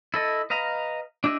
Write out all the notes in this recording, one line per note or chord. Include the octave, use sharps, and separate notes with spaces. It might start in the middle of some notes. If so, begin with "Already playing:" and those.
E4 A4 D#5
B4 D#5 F5 A#5
D4 E4 G4 D#5 E5